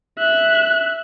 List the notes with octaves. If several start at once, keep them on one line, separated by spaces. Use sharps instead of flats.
E5 F#6